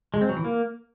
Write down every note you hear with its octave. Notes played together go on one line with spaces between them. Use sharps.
G#3
C4
F#3
E3
A#3